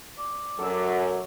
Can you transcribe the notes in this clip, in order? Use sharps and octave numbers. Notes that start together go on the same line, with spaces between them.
D5
F#2 F#3 A4 D6 E6